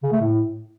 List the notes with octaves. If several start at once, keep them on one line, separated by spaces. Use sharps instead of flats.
C#3
A3
A2